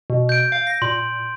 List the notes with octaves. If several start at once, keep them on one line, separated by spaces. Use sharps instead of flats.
B2
G6 D7
F5
A#6
A#2 C6